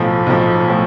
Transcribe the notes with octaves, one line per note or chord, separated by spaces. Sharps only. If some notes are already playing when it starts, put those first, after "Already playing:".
Already playing: B1 A2 F3
B1 A2 F3
A2 F3